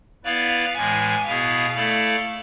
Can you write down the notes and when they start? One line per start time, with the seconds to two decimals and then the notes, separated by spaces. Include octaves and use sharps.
0.25 B3 E4 B4 D5 F5
0.75 A2 E3 G#3 G#5
1.25 B2 B3 E4 G#4 F5
1.75 A3 E4 A4 D5